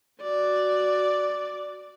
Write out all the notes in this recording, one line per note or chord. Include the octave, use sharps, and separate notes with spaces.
F#4 D5